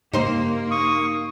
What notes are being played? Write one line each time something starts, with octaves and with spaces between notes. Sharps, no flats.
G2 C#3 A#3 D#4 G4 C5
C#6 D#6